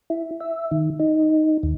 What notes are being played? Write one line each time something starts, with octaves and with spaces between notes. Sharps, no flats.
E4
E5
D#3
D#4
D#2